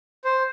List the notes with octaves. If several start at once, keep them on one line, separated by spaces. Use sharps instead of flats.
C5